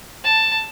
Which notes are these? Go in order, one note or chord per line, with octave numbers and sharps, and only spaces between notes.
A5